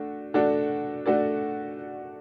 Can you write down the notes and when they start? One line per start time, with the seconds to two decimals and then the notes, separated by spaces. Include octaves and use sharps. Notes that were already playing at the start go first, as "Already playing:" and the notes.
Already playing: A3 D4 F#4
0.34 A3 D4 F#4 A4 D5
1.06 A3 D4 F#4 A4 D5